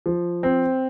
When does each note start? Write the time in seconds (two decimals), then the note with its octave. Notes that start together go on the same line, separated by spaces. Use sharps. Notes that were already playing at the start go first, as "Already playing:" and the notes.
0.06 F3
0.43 C4